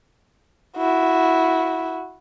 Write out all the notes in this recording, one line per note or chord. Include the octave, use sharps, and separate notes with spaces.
E4 F#4